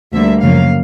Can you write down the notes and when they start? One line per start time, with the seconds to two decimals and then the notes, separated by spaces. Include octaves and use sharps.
0.13 D2 D3 G3 A#3 E5
0.42 F#2 C#3 F3 A#3 F5